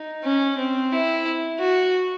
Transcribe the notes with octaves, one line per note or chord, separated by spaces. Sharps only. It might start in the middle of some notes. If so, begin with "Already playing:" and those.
Already playing: D#4
C#4
C4
E4
F#4